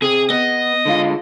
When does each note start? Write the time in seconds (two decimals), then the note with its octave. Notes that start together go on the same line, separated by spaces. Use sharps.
0.02 C3 G#4
0.30 B3 D#5
0.85 D3 G#3 F4